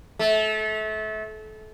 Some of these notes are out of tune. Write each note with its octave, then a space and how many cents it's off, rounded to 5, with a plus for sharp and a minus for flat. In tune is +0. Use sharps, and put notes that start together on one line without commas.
A3 -30